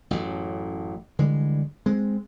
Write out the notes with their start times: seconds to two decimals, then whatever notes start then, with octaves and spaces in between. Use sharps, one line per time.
0.11 A1 F#2 A2
1.19 D3 E3 G3 G#3
1.86 G#3 C4